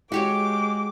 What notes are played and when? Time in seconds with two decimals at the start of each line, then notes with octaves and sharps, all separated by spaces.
0.12 G#3 F#4 G4 C#5 D6